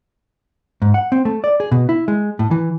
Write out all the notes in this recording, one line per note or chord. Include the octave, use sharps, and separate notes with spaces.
G#2
F#5
C4
A3
D5
G#4
B2
E4
G#3
A2
E3